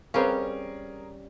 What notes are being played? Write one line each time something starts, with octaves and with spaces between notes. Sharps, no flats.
G3 C4 C#4 G#4 A#4 B4 F5